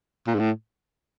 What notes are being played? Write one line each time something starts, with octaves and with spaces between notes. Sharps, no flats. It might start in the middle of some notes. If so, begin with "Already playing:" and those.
A#2
G#2
A2